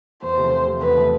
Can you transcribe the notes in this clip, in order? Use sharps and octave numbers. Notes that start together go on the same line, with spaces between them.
E2 C5
C3 F3 A3
E2
C3 F3 A3
E2 B4
C3 F3 A3